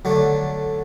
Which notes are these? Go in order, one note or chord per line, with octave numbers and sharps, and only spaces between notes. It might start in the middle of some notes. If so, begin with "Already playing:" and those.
D3 F#3 A3 D4